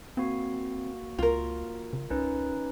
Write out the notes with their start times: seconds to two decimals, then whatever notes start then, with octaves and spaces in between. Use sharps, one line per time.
0.17 A#3 C4 F#4
1.19 C#2 F4 A#4
1.93 C#3
2.10 C#2 C#4 D#4 B4